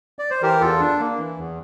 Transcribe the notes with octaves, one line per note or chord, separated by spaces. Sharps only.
D5
C5
E3 G4 A#4
E2 F4 A4
D4
A#3
E3
E2